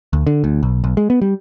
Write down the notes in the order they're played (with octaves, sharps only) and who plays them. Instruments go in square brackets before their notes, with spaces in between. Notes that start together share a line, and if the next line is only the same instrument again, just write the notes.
[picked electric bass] D2
D3
D2
B1
B1
G#3
B3
G3